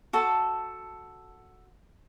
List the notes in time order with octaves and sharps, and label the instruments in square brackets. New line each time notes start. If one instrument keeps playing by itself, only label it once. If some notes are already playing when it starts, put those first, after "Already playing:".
[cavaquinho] F#4 A4 A5